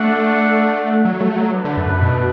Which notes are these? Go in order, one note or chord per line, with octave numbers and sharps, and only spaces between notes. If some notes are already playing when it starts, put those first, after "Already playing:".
Already playing: A3 D4 F#4 A4 D5 F#5
F#3
A3
F#3
A3 D4 B4
D3
F#2
F#2
B2